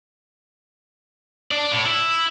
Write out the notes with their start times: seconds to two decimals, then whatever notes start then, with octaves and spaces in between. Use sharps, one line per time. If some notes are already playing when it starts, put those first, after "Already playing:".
1.51 D4 D5
1.72 A2
1.86 E4